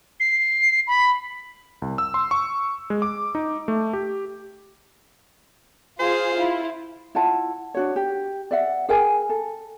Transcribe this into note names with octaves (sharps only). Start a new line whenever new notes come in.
C7
B5
C2
E6
C6
C#6
G#3
D6
D#4
A3
G4
F4 G#4 C5 F5
E4 F4
E4 F4 F#5 A5
D4 F#4 C#5
G4
D5 E5 F#5
G#4 A#4 G5 G#5
A4